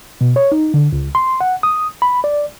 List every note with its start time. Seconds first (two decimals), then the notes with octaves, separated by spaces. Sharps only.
0.21 B2
0.36 C#5
0.52 D#4
0.74 D3
0.92 C#2
1.15 C6
1.41 F#5
1.63 D#6
2.02 B5
2.24 D5